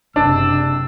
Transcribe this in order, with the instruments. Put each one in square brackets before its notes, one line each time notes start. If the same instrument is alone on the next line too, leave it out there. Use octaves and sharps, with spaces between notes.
[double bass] F#1 C3 [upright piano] D4 [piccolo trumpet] E6